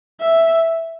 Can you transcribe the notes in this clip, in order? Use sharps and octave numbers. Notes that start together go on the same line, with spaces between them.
E5